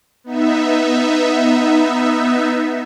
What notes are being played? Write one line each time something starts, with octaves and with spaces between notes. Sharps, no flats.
B3 D#4 E5